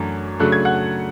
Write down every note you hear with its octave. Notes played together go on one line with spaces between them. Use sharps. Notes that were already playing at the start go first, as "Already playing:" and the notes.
Already playing: F#2 E3 A3 D4
C#3 F#3 A3 D4 F#6
G#6
F#5 F#6